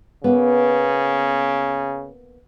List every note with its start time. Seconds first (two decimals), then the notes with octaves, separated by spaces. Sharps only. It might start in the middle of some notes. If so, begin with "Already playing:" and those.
0.24 C#3 A#3 B3